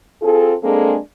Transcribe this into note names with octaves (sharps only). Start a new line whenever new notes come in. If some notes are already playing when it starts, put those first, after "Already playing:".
C4 F4 G#4 A4
G#3 A#3 C4 D4 G#4 A4